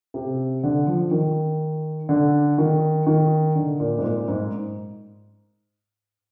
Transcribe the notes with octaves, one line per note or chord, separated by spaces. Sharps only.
C3
D3
F3
D#3
D3
D#3
D#3
D3
A#2
G#2
A#2
G#2